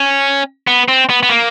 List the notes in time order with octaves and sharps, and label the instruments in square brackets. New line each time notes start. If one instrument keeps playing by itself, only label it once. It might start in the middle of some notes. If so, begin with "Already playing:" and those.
Already playing: [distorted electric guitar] C#4
B3
C4
B3
B3
A#3